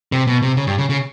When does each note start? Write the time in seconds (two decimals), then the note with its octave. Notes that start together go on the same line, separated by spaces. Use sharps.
0.12 C3
0.27 B2
0.42 C3
0.57 C#3
0.67 G2
0.78 C#3
0.89 C#3